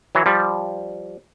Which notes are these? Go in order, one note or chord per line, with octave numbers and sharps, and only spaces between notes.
E3 F#3
F3 G3